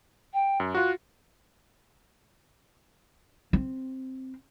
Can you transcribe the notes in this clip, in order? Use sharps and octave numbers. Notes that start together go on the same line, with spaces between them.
G5
F#2
F4 F#4 F#6
C4